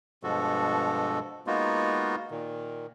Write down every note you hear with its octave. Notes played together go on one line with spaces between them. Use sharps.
G2 B2 F3 G#3 F#4 A4
G#3 A#3 B3 D#4 F4 F#4
A#2 D#3